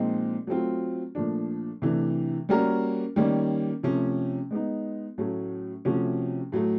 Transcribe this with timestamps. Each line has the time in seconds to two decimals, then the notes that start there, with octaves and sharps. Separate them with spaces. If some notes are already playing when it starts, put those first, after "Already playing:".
Already playing: A#2 F3 G#3 C4 D#4
0.47 F#3 A3 C4 F4
1.15 A#2 F3 A3 D4
1.82 C3 E3 A3 D4
2.49 G3 A#3 C#4 F#4 A#4
3.16 D#3 G3 A#3 C#4
3.83 C3 F3 A3 C#4
4.51 G#3 B3 D#4
5.18 A2 F#3 A3 C#4
5.85 C3 F3 A3 C#4 F#4
6.52 A2 F#3 A3